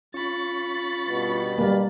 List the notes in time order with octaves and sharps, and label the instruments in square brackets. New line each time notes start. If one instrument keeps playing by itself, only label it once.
[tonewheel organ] C#4 F4 C#6 [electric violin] B5 A6
[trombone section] G2 B2
[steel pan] G3 A#3